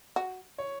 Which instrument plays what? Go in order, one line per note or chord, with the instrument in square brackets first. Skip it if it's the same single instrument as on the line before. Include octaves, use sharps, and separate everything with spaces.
[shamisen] F#4
[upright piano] C#5